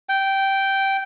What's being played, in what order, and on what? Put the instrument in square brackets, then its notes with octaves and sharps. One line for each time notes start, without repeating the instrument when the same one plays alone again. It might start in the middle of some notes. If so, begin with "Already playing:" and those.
[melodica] G5